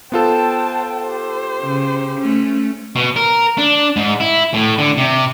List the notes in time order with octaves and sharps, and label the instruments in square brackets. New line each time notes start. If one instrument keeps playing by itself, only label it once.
[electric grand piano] B3 F4 A4 [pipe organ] C5 [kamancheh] G5 A5
[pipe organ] G4 [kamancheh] C5
[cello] C#3
A3 C#4
[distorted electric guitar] B2
A#4
D4
G#2
E4
A2
D3
C3